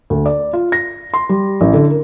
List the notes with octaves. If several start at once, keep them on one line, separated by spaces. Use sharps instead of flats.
D2
D5
F4
A#6
C6
G3
A1
D3
A#4